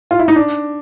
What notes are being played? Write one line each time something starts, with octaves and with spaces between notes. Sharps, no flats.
F4
E4
D#4
D4